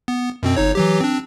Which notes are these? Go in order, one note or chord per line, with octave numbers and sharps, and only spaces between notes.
B3
F#2 B2 C4
G1 D#4 C#5
E3 F#3 G4
C4 D4